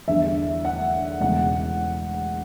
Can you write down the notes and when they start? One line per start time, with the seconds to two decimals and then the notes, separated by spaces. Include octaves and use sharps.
0.08 E2 D3 G3 D4 E5
0.65 F#5
1.20 E1 E2 C#3 F#5